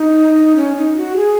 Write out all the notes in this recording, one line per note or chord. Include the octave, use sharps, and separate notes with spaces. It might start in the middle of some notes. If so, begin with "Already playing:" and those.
Already playing: D#4
D#4
C#4
D#4
F#4
G#4